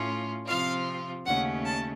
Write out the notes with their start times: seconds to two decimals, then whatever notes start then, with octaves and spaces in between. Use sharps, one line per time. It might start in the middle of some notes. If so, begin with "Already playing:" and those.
Already playing: A2 A3 C#4 F4
0.46 C3 F3 C4 F4 F5
1.25 D#2 C#3 A3 C#4 F#5
1.65 A5